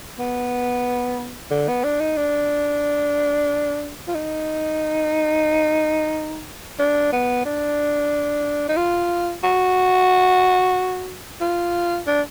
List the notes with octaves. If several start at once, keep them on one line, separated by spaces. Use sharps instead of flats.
B3
D3
B3
D4
D#4
D4
F4
D#4
D4
B3
D4
D#4
F4
F#4
F4
D4